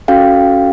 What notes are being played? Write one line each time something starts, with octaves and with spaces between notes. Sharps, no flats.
C#4 F#4 A4 F5 G5